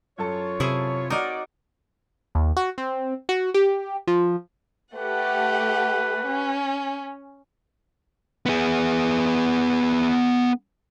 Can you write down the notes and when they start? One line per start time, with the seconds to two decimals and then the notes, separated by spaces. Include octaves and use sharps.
0.18 F#2 F4 A4 C#5 A5
0.60 C3 E4 G#4
1.10 C4 D#4 F#4 A#4 C#5 D5 F#5
2.35 D#2
2.57 F#4
2.78 C4
3.29 F#4
3.54 G4
4.07 F3
4.96 A3 G4 B4 F#5
6.28 C#4
8.46 B3 G#4